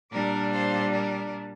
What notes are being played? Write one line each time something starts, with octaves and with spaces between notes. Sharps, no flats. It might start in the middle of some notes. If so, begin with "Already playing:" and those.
A#2 G3 D4 A#4 D5
C5 F5
A#4 D5